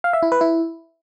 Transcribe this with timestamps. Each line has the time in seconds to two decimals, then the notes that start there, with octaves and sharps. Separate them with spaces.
0.04 F5
0.13 E5
0.23 E4
0.32 B4
0.41 E4